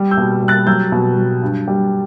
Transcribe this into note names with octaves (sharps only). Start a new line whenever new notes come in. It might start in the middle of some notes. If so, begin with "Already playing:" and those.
Already playing: G3
E6 G6
B2
G3
F#6 A6
F#3 E6 G6
B2
F#3
G2
G3